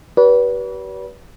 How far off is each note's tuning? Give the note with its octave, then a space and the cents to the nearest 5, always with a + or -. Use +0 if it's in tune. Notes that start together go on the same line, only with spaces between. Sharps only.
G4 -45 B4 -25 D5 -45